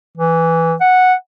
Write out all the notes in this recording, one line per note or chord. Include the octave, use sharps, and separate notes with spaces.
E3
F#5